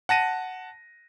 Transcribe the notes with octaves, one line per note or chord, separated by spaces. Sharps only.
F#5 A5 A#6 D#7